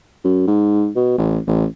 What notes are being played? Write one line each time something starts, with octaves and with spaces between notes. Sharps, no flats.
F#2
G#2
B2
A1
A1